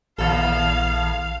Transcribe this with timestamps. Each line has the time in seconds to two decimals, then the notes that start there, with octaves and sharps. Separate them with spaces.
0.18 A#1 D#2 A4 F5 A5